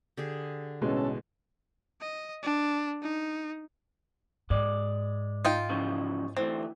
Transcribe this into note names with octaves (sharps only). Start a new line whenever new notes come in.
D3 G4 G#4
A1 B2 G#3 C#4 A4
D#5
D4
D#4
G#2 G#3 D5
D#4 F4 G5
C#3 E3 F3
D2 E3 A3 C4